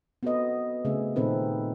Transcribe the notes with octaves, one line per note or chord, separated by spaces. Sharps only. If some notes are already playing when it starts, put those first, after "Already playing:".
B3 C4 F#4 A4 B4 D#5
C#3 A3 C4 G#4 E5
A#2 D#3 C4 D#4 A4 B4